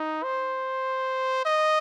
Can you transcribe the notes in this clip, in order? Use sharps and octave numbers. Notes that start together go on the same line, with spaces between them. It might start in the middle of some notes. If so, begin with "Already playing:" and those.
Already playing: D#4
C5
D#5